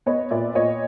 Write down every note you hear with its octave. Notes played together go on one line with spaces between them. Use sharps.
B3 C#5 D#5
A#2 D5 E5
A#2 C#5 D#5